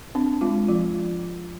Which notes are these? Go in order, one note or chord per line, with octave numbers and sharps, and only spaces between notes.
C4 D4
G#3 F4
F3 F4